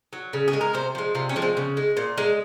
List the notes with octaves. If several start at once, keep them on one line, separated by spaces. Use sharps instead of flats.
F#3
C#3
G#4
G#3
A#4
C3 C5
F3 G#3
C3 F4
C#4
F3 G#3
C4
C#3
G#3
A#2
G#3